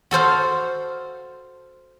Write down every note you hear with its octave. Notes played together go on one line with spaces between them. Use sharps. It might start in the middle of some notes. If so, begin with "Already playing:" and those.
F#4 A4 C5 F5